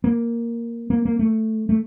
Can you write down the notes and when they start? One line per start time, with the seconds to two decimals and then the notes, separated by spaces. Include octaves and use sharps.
0.04 A#3
0.90 A#3
1.05 A#3
1.19 A3
1.69 A3